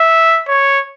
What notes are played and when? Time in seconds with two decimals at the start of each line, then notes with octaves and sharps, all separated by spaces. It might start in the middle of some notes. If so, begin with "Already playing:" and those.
Already playing: E5
0.48 C#5